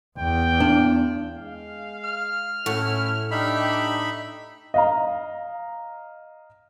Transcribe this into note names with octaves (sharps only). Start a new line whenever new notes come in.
E2 G5
B3 D4
G#3 F5
F6
A2 A3 C#4 E4 F#4
D4 D#4 G4 E5 B5
D#5 F5 A#5